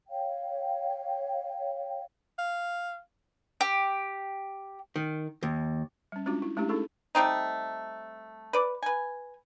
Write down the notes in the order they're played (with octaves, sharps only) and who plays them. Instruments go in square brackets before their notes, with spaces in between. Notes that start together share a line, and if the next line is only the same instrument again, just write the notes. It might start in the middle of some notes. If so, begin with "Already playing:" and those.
[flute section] C#5 F5 G5
[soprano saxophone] F5
[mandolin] G4
[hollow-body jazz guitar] D#3
D#2
[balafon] G3 C#4
G#3 C#4 D4 F4 F#4
E4
G#3 A3 C#4 D4 E4 G4
C#4 D#4 E4 G#4 A4
[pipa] G3 A3 C4 D#4
B4 D5
B4 G#5